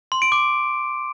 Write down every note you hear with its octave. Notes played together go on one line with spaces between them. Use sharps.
C6
D7
D6